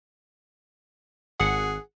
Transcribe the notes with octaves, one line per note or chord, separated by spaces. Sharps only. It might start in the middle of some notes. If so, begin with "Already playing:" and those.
G#1 G#4 F#5